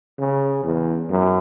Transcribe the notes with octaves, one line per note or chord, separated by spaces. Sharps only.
C#3
E2
F#2